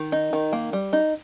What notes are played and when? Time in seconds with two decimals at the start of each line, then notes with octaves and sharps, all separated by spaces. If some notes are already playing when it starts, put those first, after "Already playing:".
Already playing: D#3
0.12 D#4
0.33 D#3
0.53 A#3
0.73 G3
0.93 D#4